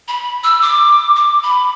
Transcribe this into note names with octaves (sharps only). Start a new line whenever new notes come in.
B5
E6
D6
D6
B5